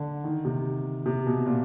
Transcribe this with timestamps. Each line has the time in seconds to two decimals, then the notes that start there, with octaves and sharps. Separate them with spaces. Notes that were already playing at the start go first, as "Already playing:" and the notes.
Already playing: D3
0.24 D#3
0.45 C3
1.06 C3
1.26 B2
1.46 A#2